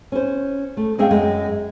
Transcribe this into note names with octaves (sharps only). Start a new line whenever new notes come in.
C#4 C5
A3
G#3 C#4 G#4 E5 F5 G5
F#2 G#3